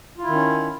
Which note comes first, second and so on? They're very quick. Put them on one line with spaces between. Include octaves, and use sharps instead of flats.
F4 E4 D#3 C#4